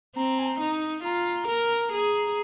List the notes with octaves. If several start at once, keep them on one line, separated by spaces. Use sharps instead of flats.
C4 A#5
G#5
A#5
D#4
F4 A#5
A#4
G#4